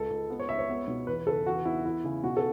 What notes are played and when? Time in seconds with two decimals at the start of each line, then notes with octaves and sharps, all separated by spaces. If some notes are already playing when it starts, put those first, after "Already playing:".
Already playing: C#2 A4
0.10 C#2
0.30 B3
0.40 C#5
0.49 C#2 E5
0.59 C#5
0.69 B3
0.88 B2
1.07 E2 B4
1.27 C#3 A4
1.46 E2 F#4
1.65 B3 E4
1.85 E3 E4
2.04 C#3
2.23 B2 F#4
2.37 A4